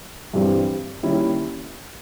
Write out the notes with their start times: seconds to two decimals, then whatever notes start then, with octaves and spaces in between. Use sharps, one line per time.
0.33 G2 E3 G3 C4
1.03 D#3 G3 A#3 C#4 E4